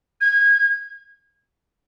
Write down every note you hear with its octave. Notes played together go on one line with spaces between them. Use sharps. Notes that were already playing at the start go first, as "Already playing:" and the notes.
G#6